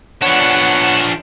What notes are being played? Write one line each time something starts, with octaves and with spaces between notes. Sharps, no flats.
F3 B3 D4 C#5 F#5